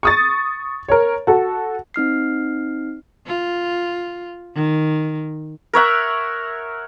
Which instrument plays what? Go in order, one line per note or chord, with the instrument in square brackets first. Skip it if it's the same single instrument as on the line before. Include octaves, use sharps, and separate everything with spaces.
[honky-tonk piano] C#6 D#6 A6
A#4 C#5
F#4 A4
[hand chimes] C4 D#4 F6 C7
[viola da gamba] F4
D#3
[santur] A#4 C#5 E5 F#5